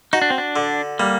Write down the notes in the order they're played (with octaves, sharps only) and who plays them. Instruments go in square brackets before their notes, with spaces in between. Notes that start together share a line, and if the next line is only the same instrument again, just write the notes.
[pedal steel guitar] D#4 [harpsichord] F#4
[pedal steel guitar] D4
C4
D4
[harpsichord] D3
[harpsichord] G3 [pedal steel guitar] A#3